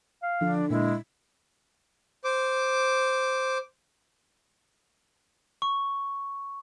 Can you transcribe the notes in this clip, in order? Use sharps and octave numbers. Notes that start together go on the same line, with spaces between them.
F5
D3 F3 D4
A#2 G#3 E4
C5 D6
C#6